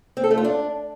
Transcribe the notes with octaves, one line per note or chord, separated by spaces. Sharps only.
C4
A4
A3
F4
D4